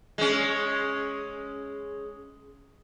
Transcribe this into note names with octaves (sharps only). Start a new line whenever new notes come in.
G#3 C#4